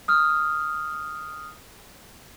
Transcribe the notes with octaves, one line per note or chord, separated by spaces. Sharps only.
D#6 F6